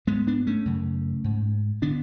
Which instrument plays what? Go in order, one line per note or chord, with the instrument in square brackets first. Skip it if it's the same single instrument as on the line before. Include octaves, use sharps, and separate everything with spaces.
[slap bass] G#2 G#3 B3
B3 D4
A3 C#4
F#2 C#3
G#2
D3 B3 D4